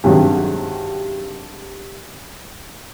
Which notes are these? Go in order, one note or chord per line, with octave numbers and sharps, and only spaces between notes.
G2 C3 D#3 F#3 G#3